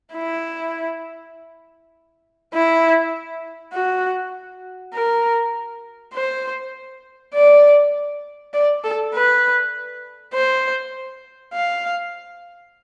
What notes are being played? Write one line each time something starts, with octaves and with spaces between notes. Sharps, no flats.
E4
E4
F#4
A#4
C5
D5
D5
A4
B4
C5
F5